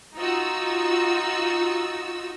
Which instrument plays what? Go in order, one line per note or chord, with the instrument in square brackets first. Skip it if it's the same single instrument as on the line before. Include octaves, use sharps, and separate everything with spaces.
[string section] D#4 F4 F#4 E6